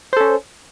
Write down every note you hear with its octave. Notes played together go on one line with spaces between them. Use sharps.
C#4 A4 C5